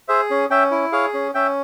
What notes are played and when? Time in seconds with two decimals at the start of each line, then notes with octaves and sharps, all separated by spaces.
0.08 G#4 C5 E5
0.30 C#4
0.50 C#4 E5 G5
0.71 E4
0.92 G#4 C#5 F5
1.14 C#4
1.34 C#4 E5 G5